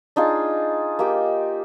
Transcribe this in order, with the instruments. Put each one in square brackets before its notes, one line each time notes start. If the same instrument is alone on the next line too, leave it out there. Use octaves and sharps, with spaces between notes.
[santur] D4 D#4 F4 G#4
A#3 G4 D#5